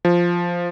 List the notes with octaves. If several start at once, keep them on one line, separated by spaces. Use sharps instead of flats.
F3